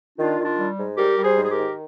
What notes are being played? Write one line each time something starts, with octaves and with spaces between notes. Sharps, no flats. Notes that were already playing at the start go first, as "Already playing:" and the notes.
D#3 D4 F4
D#3
D4 F4
G3
G#2
G3 G4 A#4
G3
G#4 C5
G#2
G#4
G4 A#4
D#3